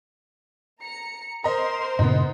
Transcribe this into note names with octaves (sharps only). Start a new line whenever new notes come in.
A#5 C#7
A#4 C5 D#5 A#5 C6
G2 A#2 C#3 B3 D#4